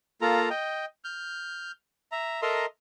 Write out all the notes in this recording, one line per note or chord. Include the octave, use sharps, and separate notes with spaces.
A#3 F4 A4 A#5
D#5 G5
F6 G6
E5 A#5
A4 A#4 D#5 E5 A#5 C6